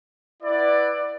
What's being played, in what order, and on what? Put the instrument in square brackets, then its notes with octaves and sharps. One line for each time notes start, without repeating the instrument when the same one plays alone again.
[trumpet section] E4 B4 D5 F#5